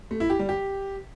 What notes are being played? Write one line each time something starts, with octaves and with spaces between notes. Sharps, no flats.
A3
E4
G4
G3
G4